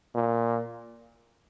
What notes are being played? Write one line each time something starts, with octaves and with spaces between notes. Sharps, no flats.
A#2